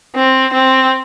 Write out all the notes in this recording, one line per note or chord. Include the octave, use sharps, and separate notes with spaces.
C4
C4